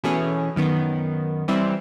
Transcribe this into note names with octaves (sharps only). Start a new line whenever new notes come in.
B2 E3 A3 C#4 G#4
F#2 D#3 B3
E3 G3 C4 E4